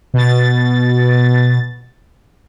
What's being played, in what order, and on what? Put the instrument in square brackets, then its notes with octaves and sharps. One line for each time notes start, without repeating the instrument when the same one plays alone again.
[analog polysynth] B2 A6